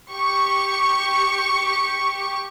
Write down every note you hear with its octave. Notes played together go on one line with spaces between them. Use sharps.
G4 C#6